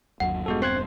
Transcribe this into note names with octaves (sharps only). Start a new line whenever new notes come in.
G1 D#2 F#3 F#5
E1 G2 G#3 B3 F#4 A4
C4 C5 F#6 G#6